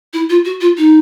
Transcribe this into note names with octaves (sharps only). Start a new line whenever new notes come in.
E4
F4
F#4
F4
D#4